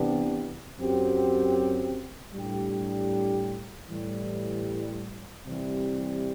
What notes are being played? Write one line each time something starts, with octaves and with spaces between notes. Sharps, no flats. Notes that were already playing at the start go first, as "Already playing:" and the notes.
Already playing: C3 E3 B3 D4 G4
F#2 F#3 C4 G4
A2 G3 D4 G4
A2 E3 G3
C3 E3 G3